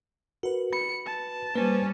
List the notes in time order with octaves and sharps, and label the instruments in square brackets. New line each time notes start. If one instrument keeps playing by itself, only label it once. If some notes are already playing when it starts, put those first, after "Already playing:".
[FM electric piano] F#4 B4 [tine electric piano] A#4
[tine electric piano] B5 [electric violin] C#7
[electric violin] A5
[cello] G3 C#4 [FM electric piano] A#3 [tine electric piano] B4 C5